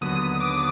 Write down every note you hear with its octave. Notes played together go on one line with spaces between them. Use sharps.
D#2 D3 F#3 B3 D#6
D#6
D6